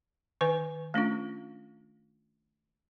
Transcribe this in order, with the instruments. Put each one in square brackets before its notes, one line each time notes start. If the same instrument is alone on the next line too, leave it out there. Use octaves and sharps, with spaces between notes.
[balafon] D#3 B4 G#5
A3 C#4 D4 F4